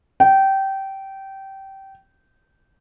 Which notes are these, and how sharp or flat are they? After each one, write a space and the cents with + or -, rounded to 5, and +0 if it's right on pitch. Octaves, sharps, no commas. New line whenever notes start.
G5 -20